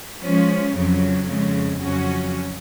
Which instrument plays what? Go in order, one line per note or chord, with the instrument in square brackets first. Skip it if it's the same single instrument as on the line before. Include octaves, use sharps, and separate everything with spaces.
[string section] F3 G#3 C#4
F2 C#3 F#3
F2 C#3 G#3
F2 C#3 F#3 C#4 F#4